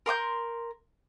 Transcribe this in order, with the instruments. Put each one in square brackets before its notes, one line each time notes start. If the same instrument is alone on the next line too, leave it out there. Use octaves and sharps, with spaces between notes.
[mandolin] A#4 C6 D6 G6